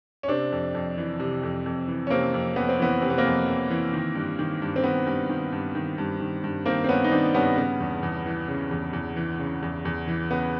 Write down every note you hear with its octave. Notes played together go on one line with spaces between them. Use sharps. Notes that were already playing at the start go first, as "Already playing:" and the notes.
C#4
C3 C4 D4
F2
F2
E3
C3
F2
F2
E3
C#4
C3 A#3 C4
F2
F2 B3
C4
E3 B3
C3 C4
B3
A#3 C4
F2
F2
E3
D#3
G2
D#3
G2
C4
D#3 B3
G2
D#3
G2
D#3
G2
D#3
G2
D#3 A#3 C4
C4
G2 B3 C#4
D#4
D#3 C4 D4
G2 B3 C#4
C#3 B3
E2
E2
E3
C#3
E2
E2
E3
C#3
E2
E2
E3
C#3 B3